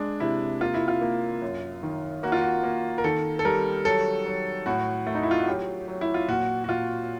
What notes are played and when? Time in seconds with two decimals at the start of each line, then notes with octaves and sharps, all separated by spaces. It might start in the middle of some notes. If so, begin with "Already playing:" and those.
Already playing: G#3 D4
0.20 C3 E4
0.61 A#3 F4
0.74 E4
0.88 F4
1.01 A#3
1.42 F#2
1.83 D#3
2.23 A#3 F#4
2.32 F4
2.42 F#4
2.64 A#3
2.98 A#4
3.04 D#3 A4
3.39 A4
3.45 G3 A#4
3.85 F#3 A4
4.26 F#3
4.66 A2 F#4
5.07 A3
5.15 D#4
5.23 E4
5.31 F4
5.39 F#4
5.47 F#3 G4
5.88 F#3
6.01 E4
6.14 F4
6.28 A#2 F#4
6.64 F#4
6.69 A#2 F4